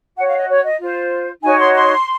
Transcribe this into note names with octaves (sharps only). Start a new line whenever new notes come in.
F#4 C#5 F#5
F5
D#5
C#5
D#5
F4 C5
D#4 F#4 C#5 G#5
C6
C6